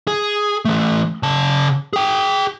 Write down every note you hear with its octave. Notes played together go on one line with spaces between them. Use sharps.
G#4
E3 A3
C#3 A5
G#4 G5